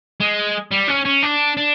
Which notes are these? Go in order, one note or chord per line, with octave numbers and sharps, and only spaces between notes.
G#3
G3
C#4
C#4
D4
D4